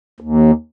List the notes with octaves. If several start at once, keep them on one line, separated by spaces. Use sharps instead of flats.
D#2